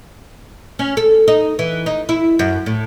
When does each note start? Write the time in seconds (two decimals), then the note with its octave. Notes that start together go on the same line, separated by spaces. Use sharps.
0.79 C#4
0.97 A4
1.28 D#4
1.59 E3
1.86 D#4
2.09 E4
2.39 F#2
2.66 A2